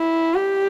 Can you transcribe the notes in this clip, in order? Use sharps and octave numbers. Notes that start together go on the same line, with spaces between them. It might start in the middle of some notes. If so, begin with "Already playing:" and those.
Already playing: E4
G4